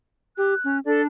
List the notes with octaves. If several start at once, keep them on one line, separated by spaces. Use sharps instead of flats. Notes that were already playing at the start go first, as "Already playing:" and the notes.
G4 F#6
C#4
D4 A4 D5